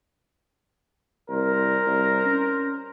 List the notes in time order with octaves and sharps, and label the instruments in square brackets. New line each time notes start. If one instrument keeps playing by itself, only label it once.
[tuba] C2 [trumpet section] A#4 C5 A#5
[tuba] C2
C#4